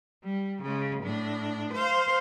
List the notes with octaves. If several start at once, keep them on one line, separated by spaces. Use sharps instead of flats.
G3
C#3 G#3
A2 D4
C5 F5